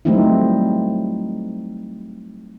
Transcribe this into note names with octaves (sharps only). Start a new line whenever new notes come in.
F#3 G3 A3 C4 D#4 E4